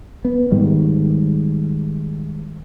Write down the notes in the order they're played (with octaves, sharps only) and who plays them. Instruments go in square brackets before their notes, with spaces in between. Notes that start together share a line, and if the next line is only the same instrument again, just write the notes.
[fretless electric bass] B3
G#2 D#3 G3 G#3